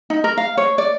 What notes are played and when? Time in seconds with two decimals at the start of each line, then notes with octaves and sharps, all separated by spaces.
0.10 D#4
0.24 A#4
0.37 F5
0.57 C#5
0.78 D5